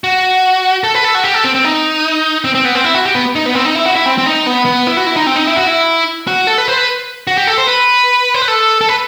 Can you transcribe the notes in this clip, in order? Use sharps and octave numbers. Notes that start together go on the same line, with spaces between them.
F#4
A4
B4
A4
F#4
G4
A4
C4
C4
D#4
C4
C4
B3
C4
E4
F#4
G4
B3
D#4
B3
C4
D#4
E4
F#4
E4
C4
C4
D#4
B3
B3
E4
F#4
E4
D#4
C4
D#4
E4
F#4
E4
F#4
A4
B4
C5
B4
F#4
G4
A4
C5
B4
C5
B4
A4
A4
B4